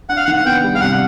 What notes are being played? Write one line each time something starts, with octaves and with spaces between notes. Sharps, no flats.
D4 F#5
F5
F#5
D#3
F#5
B3 G5
G3
F5
C2 F#5